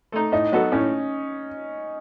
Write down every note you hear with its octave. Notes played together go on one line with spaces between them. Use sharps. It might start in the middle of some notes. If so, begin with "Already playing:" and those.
A3 D#4
A2 D#4
F#3 B3 F#4 A4
A2 C#4